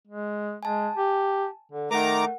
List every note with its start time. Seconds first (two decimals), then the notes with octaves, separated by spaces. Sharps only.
0.07 G#3
0.63 G#3 G#5 A5
0.97 G4
1.72 D3
1.91 D#3 A3 A#4 F#5 A#5 D6